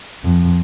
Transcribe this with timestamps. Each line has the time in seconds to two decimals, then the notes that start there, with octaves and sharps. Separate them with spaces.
0.24 F2